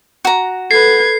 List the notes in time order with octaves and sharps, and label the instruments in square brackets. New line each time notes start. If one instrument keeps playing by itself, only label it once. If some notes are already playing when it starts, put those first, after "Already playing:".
[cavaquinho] F#4 A#5
[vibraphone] A4 [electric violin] B4 G#6 [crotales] C7